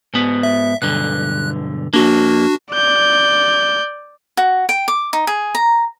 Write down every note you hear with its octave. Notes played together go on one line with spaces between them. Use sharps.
G#2 B3
E5
B1 G2 D3 F#6
F2 A#3 D4 F#4
D5 G6
F#4
G5
D6
D#4
G#4
A#5